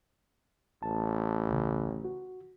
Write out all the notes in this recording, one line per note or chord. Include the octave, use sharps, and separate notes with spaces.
A1 A5
C#2 C#3
F#4